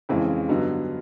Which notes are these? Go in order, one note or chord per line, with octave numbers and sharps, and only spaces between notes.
F2 C#3 E3 G#3
G2 D3 F#3 B3 D#4